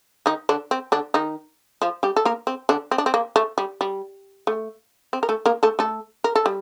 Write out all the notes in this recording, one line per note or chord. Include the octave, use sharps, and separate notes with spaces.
D#3 D#4
D3 D4
C4
D3 D4
D#3 D#4
F3 F4
G3 G4
A4
A#3 A#4
C4
D3 D4
C4
D4
C4
A#3
A3
G3
G3
A3
C4
A#4
A3 A4
A#3 A#4
A3 A4
A3 A4
A#4
A4
G3